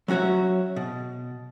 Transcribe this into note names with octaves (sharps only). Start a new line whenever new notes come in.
F#3 C#4 F#4 C#5 E5
B2